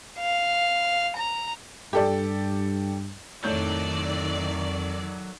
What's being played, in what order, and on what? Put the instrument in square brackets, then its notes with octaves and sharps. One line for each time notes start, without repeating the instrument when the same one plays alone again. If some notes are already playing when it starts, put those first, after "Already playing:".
[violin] F5
A#5
[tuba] G2 [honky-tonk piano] G4 A4 D5
[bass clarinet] F2 [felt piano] A2 C#5 G6 [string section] D#3 D5 [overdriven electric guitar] F#3 A4